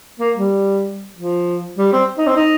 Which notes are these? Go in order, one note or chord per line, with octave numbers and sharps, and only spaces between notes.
A#3
G3
F3
G3
C4
D#4
C4
D#4